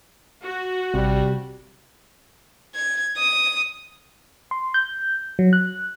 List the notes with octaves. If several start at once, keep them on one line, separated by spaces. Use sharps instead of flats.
F#4
A1 C3 G3
G#6
D#6
C6
G6
F#3
F#6